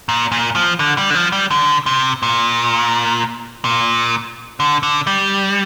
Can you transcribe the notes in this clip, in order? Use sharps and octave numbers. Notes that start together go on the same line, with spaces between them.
A#2
A#2
F3
D3
G3
D3
F3
G3
D3
C3
A#2
A#2
D3
D3
G3